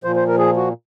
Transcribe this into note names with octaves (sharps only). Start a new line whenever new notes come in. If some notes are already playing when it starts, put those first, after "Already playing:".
A#2 F3 C5
C5
A#4
G#4
F#4